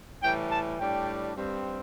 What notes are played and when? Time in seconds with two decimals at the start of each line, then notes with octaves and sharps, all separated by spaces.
0.23 A2 E3 G3 G5
0.52 A5
0.79 A2 G3 D4 G5
1.36 G2 G3 C4